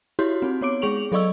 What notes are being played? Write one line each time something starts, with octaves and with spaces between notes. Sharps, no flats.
E4 F#4 G4 C#5 C6 G6
C4 D#4
B3 C#5 D6 D7
G#3 G#4 C#6 F7 F#7
F#3 A4 D5 D#5 C#6 E6